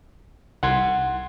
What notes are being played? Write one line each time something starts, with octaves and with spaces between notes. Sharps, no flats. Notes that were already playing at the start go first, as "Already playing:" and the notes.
C2 F#5 C6 G#6